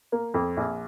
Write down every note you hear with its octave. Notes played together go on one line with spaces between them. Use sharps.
A#3
F2
A#1